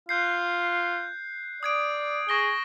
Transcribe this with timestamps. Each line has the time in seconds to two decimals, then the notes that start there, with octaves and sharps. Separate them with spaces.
0.09 F4 F#6 G6 C7
1.63 D5 D#6 G#6 D7
2.29 G#4 C#6 A#6 G7